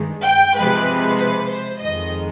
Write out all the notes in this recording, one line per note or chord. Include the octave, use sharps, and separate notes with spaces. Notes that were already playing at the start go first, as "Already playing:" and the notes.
Already playing: G2 D#3 G#3
G5
C3 F3 G#3 B4
B4
C5
F2 D#3 G#3 D#5